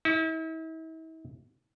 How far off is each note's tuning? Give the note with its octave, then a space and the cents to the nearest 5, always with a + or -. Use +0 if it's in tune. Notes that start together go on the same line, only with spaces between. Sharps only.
E4 -40